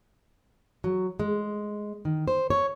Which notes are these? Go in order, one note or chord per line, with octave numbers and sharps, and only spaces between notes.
F#3
G#3
D#3
C5
C#5